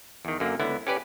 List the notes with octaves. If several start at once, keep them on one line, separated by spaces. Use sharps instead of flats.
E2 D#3
F#2 D3 A#3
C#2 D3 B3 E4
C#4 G4 B4 D5